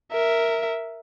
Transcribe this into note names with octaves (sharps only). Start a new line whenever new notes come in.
A#4 E5